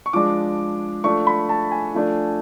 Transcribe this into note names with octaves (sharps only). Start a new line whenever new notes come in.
C#6
F3 G#3 D4 D6
F3 A3 D4 C#6
B5
A5
G#5
F3 A3 D4